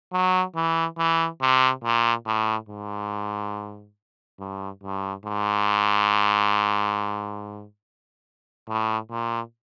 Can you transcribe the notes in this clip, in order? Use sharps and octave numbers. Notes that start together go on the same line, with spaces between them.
F#3
E3
E3
C3
A#2
A2
G#2
G2
G2
G#2
A2
A#2